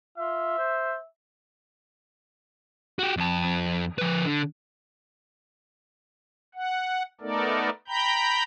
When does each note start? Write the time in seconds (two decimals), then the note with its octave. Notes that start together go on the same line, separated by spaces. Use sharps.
0.18 F4 E5
0.58 C5
2.99 F#4 G4
3.17 F2 A5
3.98 F3 B4
4.25 D3
6.55 F#5
7.21 A3 B3 D#4 A4 A#4 D5
7.88 G5 A#5 B5 G6